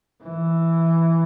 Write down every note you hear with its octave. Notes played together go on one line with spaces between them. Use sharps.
E3